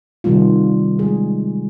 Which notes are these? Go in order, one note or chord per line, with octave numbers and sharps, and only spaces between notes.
C3 D#3 G3 A#3 F4
G#3 G#4